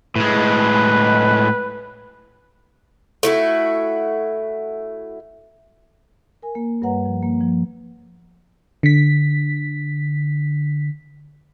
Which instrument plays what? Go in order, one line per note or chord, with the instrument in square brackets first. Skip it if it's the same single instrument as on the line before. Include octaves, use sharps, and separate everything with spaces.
[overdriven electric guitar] A2 G#3 [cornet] B4
[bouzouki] A3 E4 F#4
[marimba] A#4 G#5
A#3
G2 G3 B4 C#5 F#5 A#5
F3
A#3
F3
[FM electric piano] D3 B6